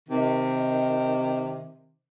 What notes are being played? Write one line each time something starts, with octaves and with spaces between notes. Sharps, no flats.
C3 D#3